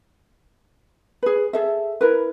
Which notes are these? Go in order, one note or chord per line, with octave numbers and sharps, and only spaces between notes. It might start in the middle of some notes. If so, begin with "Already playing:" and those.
G#4 B4
G#4 A4 E5
E4 A#4 B4